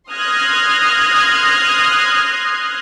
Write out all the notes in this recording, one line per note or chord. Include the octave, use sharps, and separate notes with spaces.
C6 D#6 F6 F#6 G#6 A#6